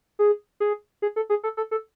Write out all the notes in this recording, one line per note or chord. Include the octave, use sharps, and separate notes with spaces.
G#4
G#4
G#4
A4
G#4
A4
A4
A4